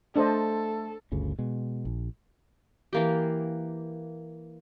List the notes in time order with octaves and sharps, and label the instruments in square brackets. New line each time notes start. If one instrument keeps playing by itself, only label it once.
[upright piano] A3 [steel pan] D4 C5 D#5 [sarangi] A4
[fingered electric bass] G1 D2 C#3
B2 G#3
A#1
[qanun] E3 A#3 G4